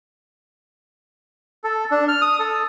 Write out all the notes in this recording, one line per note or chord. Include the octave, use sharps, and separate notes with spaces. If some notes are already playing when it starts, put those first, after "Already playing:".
A4
D4
F6
D#6
A4